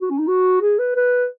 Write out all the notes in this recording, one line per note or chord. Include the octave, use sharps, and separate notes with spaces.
F#4
C#4
D#4
F#4
G#4
B4
B4